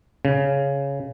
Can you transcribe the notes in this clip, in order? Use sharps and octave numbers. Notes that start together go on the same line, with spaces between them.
C#3